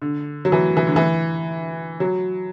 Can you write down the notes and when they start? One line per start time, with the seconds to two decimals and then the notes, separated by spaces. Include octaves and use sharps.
0.02 D3
0.45 F#3
0.52 E3
0.77 E3
0.87 D3
0.96 E3
2.00 F#3